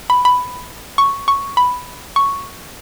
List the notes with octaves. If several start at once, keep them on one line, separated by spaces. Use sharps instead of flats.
B5
B5
C#6
C#6
B5
C#6